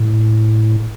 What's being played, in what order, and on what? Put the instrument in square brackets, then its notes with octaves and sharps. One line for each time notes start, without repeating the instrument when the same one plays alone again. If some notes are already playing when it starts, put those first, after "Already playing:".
Already playing: [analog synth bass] A2